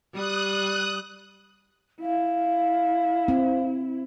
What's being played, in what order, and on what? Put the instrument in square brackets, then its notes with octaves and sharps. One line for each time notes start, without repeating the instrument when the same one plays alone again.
[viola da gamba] G3 [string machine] D#6 F#6
[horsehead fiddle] E4 [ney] F5
[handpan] C4